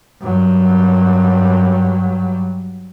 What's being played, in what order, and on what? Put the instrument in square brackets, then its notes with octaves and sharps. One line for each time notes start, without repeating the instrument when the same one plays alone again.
[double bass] G2 F#3